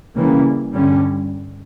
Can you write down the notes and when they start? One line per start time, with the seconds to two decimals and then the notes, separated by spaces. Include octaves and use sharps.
0.16 C#3 E3 G3 A#3 C#4
0.73 G2 D3 G3 C#4